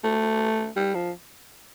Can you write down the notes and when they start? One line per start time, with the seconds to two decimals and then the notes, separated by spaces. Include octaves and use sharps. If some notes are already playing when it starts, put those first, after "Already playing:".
0.04 A3
0.76 G3
0.95 F3